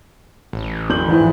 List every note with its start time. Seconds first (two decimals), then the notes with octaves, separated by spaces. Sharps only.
0.53 A1
0.90 D1 G6 F#7
1.08 A#1 G#2 E3